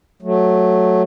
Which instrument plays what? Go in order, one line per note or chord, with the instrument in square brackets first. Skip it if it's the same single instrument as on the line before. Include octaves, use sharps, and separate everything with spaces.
[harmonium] F#3 A3